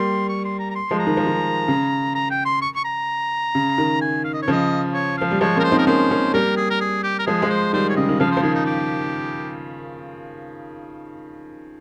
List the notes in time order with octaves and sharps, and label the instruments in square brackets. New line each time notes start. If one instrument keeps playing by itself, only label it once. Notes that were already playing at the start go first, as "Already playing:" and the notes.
Already playing: [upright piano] G3 A#3 [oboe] C6
[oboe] C#6
C6
A#5
A#5
C6
[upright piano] F3 G#3
[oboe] A#5
[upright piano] D#3
F3
D#3
C#3
[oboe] A#5
G5
C6
C#6
C#6
A#5
[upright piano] C#3
D#3
[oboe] G#5
F5
D#5
C#5
[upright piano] C#3 F3 [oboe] D#5
[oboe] C#5
[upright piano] F3 [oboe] F5
[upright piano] G3
[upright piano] F3 G#3 [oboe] C#5
[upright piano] A#3 C#4 [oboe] A#4
[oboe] C5
[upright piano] C4 D#4
[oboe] A#4
[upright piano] A#3 C#4 [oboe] C5
[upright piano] A#3 C#4
[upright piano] G3 A#3 [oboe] A#4
[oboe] G#4
A#4
G#4
G4
A#4
[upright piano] F3 G#3 [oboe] G#4
[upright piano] F3 G#3
[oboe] C5
[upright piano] D#3 G3 [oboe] C5
[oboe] C#5
[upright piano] C#3 [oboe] D#5
[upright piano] D#3
[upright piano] C#3 F3 [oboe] F5
[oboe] C5
[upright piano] F3
[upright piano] D#3 [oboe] G#4
[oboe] D#4
G4